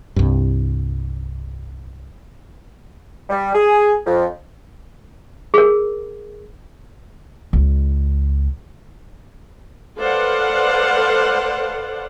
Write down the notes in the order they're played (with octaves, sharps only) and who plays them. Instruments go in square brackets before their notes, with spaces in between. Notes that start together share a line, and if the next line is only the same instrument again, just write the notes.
[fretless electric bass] C2 G2
[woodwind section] G3
G#4
F2
[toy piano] G#4 A#4
[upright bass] C#2
[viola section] A4 B4 C5 D5 F5 F#5